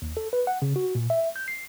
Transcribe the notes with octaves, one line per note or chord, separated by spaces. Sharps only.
D#2
A4
B4
F#5
C#3
F#4
A#2
E5
G6
C7